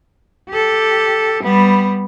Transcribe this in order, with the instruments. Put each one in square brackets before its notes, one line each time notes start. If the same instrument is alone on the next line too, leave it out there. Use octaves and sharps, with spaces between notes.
[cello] G4 A4
G3 B3